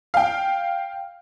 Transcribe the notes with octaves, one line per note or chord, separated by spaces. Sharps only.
F5 G5